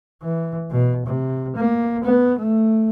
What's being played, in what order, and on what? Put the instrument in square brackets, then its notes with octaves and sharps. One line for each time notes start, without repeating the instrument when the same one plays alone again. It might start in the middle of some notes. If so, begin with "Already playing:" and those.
[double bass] E3
B2
C3
A#3
B3
A3